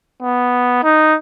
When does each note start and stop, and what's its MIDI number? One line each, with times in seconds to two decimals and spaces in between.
0.22 0.79 59
0.84 1.16 63